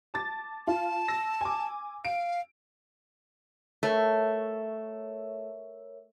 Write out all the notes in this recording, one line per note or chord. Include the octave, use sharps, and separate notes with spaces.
A5 D6 A6
F4 A5
E6 A#6
G#5 D6
F5 D7
A3 A#4 C#5 E5